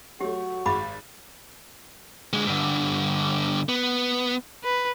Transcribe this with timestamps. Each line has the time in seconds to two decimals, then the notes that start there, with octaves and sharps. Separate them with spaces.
0.20 F#3 A3 F#4 G4
0.66 G#1 G#3 G#4 B5 D6 A6
2.33 D3 G#3
2.47 G2 D3
3.69 B3
4.64 B4